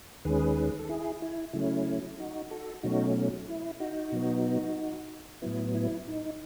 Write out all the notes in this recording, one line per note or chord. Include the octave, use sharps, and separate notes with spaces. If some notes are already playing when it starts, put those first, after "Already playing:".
D#2 D#3 G#3 C#4 G#4 B4
A4
E4 G#4
E4
C#3 F#3 A3 C#4 E4
D#4 F#4
F#4 A4
B2 F#3 A3 C#4 D#4 F#4
E4
D#4 F#4
B2 F#3 B3
A2 F#3 B3 E4
E4
D#4